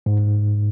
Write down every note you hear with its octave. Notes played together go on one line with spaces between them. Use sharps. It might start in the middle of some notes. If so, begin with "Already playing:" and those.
G#2